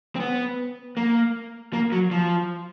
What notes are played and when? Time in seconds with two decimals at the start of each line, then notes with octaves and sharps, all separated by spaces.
0.16 C4
0.20 B3
0.97 A#3
1.73 A#3
1.92 F#3
2.11 F3